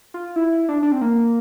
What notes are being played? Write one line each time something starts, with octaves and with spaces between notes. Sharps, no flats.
F4
E4
D4
D4
C4
A#3